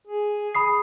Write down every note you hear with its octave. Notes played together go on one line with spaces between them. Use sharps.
G#4
B5 D#6 C7